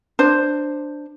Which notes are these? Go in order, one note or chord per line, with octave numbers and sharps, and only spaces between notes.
D4 C5